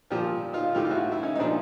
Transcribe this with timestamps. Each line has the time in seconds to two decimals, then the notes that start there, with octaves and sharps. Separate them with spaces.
0.10 A#2 F3 F4 G4
0.53 D#4 F4
0.75 A2 E3 F4 G4
0.85 F4
0.91 E4 F#4
1.12 E4
1.23 C#4 D#4
1.36 D#4
1.39 A#2 F3 C4 D4